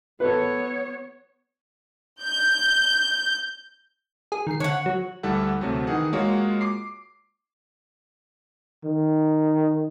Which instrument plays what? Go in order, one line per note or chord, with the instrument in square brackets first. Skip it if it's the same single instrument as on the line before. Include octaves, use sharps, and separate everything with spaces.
[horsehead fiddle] B3 C#5 [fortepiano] A4 B4
[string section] G6
[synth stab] G#4
D#3 C7
[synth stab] D3 [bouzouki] C#5 F#5
[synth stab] F#3
[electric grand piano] D2 G3 E4 A4 F#5
D2 C3 F#3 A3
D#3 E3 G#4 F#5
G#3 A#3 F4 F#4 C#5
D6 C7
[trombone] D#3